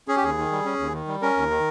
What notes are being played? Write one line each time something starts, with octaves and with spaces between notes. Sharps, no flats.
C#4 G#4
G4
D#2 G#4
D#3
G3
C#4
D#2
D#3
G3
C#4 A#4
D#2
D#3